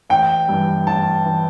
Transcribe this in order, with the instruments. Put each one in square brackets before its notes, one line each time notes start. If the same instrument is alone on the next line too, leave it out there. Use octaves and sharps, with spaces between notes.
[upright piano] A1 G5
G2 E3
A1 A5
E3